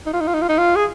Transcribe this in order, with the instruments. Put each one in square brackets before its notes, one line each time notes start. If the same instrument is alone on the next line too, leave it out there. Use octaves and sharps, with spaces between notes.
[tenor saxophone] D#4
F4
D#4
F4
D#4
F4
D#4
F4
G#4